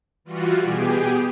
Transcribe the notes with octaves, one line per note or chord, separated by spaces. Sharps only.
E3 G3 F4 F#4
B2 G4 G#4